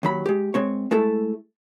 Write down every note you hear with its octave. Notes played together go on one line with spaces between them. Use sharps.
D#2 F#3 B5
G#3 G4
G#3 C4 C#5
G#3 A3 E4 A4